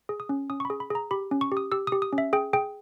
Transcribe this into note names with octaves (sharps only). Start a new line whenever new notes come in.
G#4
D#6
C#4
C#4 D#6
C#6
B5
G#4
B5
G#4 A#5
G4 B5
C#4
C#6
G4
D#6
G4 E6
G4 D#6
D#6
C#4
E5
G#4 G5
G#4 G5